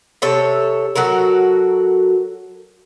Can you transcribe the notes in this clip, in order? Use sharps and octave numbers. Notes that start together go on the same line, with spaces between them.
C3 A4 C#5
F#3 F#4 A4 A#4